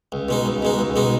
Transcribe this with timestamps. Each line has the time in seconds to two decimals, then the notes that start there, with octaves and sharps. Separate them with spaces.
0.12 C#2
0.29 B2 G#3 D#4
0.46 C#2
0.62 B2 G#3 D#4
0.79 C#2
0.96 B2 G#3 D#4